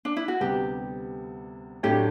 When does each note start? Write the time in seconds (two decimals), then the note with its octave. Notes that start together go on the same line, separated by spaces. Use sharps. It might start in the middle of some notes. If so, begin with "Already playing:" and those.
0.05 D4
0.16 E4
0.28 F#4
0.40 D2 C3 G3 B3 G4
1.83 A2 F#3 A3 D4 G4